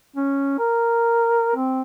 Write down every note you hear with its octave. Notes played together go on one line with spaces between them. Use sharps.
C#4
A#4
C4